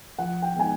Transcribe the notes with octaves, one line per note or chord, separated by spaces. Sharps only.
F3 F#5
G5
G#3 B3 D#4 G#5